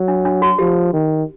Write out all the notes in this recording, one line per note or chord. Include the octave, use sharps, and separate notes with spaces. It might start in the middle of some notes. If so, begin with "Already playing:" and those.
Already playing: F#3
D4
D4
F#4
F3 G4
D#3